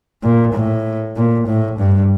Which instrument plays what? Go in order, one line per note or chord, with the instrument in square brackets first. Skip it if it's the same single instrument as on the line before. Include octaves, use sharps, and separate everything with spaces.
[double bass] A#2
A2
A#2
A2
G2